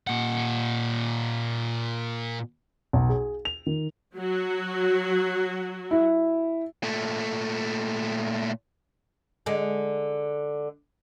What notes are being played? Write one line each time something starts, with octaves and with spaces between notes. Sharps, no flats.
A#2 F#5
B1
G#4
F7
D#3
F#3 F#4
E4
A#2 A3
D3 G#3